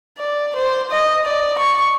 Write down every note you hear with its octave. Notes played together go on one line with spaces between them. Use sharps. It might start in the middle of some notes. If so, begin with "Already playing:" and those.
D5
C5
D#5
D5
C#6